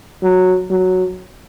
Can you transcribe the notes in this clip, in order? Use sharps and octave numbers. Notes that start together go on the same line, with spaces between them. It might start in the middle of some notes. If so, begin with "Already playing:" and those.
F#3
F#3